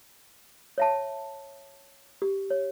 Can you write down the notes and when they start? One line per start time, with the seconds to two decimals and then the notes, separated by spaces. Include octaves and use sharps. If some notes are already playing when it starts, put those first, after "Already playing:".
0.78 C#5 E5 A5
2.22 G4
2.50 C#5